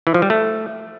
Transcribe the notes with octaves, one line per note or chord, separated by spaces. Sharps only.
E3
F3
G3
A3